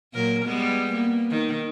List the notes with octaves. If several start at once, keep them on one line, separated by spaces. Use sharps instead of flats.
A#2 F#3 A#4
G3 G#3 B3
A#3 B3
D#3